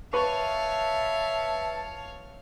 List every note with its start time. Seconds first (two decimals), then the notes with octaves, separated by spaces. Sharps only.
0.13 B4 C#5 E5 F5 A5 C#6